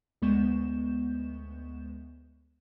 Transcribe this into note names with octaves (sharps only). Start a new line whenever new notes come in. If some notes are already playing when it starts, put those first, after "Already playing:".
D2 G#3 B3 C#6 G6 E7